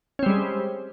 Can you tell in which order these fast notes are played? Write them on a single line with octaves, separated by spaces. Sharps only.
C#4 C4 G3 G#3